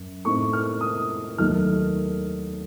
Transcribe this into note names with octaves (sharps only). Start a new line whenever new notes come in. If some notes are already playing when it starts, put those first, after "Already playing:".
Already playing: F#2
A2 A3 C4 D#4 C#6
F6
D#6
D#2 D#3 F#3 A3 D#4 F6